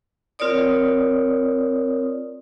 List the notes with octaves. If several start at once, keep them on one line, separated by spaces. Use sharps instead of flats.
C4 F4 A#4 C#5 D5 D#6